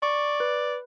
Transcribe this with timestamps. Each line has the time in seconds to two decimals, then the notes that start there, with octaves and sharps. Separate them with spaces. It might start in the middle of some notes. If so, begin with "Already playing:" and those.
0.02 D5 C#6
0.40 B4